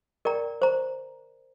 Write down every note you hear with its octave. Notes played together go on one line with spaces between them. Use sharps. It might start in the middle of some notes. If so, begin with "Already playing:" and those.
A#4 D5 G5 A#5
C5 A#5